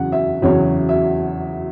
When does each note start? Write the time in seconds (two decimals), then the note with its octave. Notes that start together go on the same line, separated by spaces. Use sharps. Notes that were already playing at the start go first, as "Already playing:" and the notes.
Already playing: E2 C#3 F#3 F#5
0.12 E5
0.42 E2 C#3 F#3 C#5
0.89 E5